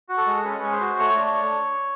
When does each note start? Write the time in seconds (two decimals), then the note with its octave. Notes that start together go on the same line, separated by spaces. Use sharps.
0.09 F#4
0.18 A4
0.27 G#3
0.44 C#4 B4
0.62 G#3
0.72 C5
0.80 F#4
0.99 A3 C#5
1.16 D4